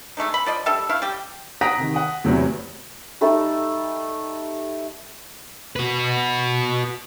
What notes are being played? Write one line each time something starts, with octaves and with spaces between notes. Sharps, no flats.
G#3 A3 D4 D#4
B5
F3 D5 D#5
G3 D4 A4 E5
A3 E4 F5
G3 G4
F#5 A#5 D#6 A#6 B6 D7
C3 D#3
F#5 D#6
E2 A2 C3 E3 F#3 B3
G3 A3 D#4 A4
F#4 B4